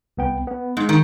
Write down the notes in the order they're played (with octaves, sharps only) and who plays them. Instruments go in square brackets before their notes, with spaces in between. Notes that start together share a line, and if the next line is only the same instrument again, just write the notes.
[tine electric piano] C2 B3 G5
B3
[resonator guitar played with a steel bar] G#2 [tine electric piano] G#3
[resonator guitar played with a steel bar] D#3